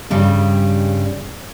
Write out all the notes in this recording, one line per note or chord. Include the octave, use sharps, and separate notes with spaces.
G2 C#3 G3